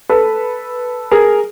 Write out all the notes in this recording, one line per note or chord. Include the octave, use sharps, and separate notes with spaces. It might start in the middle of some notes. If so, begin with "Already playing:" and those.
A4 B4
G#4 A#4